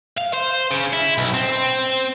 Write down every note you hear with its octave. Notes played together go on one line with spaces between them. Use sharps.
F5
C5
C#3
E4
B1
C4